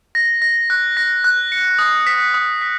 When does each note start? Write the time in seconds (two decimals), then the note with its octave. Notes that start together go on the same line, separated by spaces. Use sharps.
0.15 A#6
0.42 A#6
0.70 F#6
0.97 A#6
1.24 F#6
1.52 C#7
1.79 D#6
2.07 B6
2.34 D#6
2.61 B6